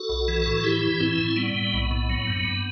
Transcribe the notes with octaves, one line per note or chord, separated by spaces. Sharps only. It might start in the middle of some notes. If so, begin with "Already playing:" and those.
Already playing: F#4 A4
B1
E3
A2
E3 E4 G4
E3
A2 C4 E4
A2
G3 B3
A2
B1
A2
F#3
G2
G2